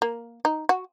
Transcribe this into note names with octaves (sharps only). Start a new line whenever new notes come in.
A#3
D#4
F#4